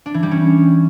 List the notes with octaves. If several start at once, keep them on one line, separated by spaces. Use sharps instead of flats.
D4
E3
G3
C#4